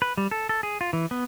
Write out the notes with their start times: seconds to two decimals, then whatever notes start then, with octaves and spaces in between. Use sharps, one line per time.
0.02 B4
0.17 G3
0.31 A4
0.49 A4
0.63 G#4
0.81 F4
0.93 E3
1.11 B3